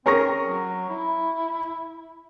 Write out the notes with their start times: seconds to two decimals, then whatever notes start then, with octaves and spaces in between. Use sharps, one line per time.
0.06 C4 C#4 G#4 A#4 A#5 C#6 A#6
0.45 F#3
0.89 E4